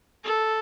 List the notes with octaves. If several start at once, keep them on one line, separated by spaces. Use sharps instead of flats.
A4